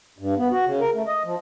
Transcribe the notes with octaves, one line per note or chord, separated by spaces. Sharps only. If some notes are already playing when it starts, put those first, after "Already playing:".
G2
B3
F#4
C#3
A#4
A3
D#5
F3